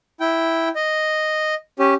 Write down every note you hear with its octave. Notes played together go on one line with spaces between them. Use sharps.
E4 G5
D#5
C#4 G4